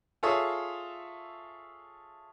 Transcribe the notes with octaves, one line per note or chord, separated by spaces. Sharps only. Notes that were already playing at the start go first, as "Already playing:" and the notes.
F4 G#4 A4 C#5 E5 D#6